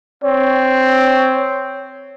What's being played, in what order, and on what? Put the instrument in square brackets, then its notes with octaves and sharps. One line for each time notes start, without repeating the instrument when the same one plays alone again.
[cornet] C4 [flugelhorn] C#5